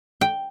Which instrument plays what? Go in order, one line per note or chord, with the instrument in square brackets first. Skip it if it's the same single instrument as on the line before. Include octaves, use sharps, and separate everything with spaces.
[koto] G5